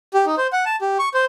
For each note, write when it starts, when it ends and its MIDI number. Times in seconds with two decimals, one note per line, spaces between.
0.14 0.26 67
0.26 0.35 63
0.37 0.47 72
0.53 0.65 78
0.65 0.76 81
0.81 0.98 67
0.99 1.09 85
1.14 1.25 72